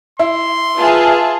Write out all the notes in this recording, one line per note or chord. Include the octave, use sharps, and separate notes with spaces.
E4 C6
F4 G#4 B4 E5 A5